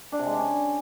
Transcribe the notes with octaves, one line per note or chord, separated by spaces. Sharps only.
D4
C3
G#3
D4
C#4